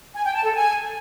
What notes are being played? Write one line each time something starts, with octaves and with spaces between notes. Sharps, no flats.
G#5
G5
A5
A4
G#5